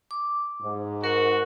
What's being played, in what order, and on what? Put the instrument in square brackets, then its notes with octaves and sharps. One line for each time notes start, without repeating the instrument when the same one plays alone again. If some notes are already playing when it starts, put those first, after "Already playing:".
[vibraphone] D6
[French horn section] G#2
[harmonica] F#4 [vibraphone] A#4